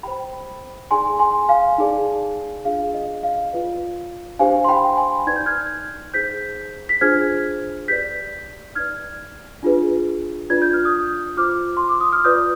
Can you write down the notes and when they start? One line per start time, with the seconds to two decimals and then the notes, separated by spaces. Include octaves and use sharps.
0.03 G4 C5 G5 B5
0.90 D#4 G#4 D5 G#5 C6
1.19 G#5 C6
1.49 F5 G#5
1.78 D#4 G#4 D5
2.65 D4 F4 G#4 F5
2.94 D#5
3.23 F5
3.52 F4 B4 D5
4.39 D4 G4 C5 F5 G#5
4.64 C6
4.69 G5 B5
4.87 B5
4.97 G#5 C6
5.27 D#4 B4 D5 G#6
5.36 G6
5.46 F6 G#6
6.14 D#4 G#4 C5 G6 B6
6.89 B6
7.01 D4 F4 G#4 C5 F6 G#6
7.88 G4 B4 D5 G6 B6
8.75 D#4 B4 D5 F6 G#6
9.63 D4 F4 G#4 B4
10.50 D4 F4 B4 D5 G#6
10.62 G6
10.73 F6
10.85 D#6 G6
11.37 F4 C5 D6 F6
11.77 C6
11.89 D6
12.01 D#6
12.12 F6
12.24 F4 B4 D5 D#6 G6